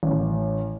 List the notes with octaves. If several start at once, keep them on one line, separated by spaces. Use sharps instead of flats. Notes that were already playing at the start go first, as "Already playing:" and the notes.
A1